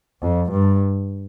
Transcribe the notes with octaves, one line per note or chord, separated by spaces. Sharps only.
F2
G2